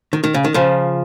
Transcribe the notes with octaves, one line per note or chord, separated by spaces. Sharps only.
D#3
D#3
C#3
D#3
C#3 F3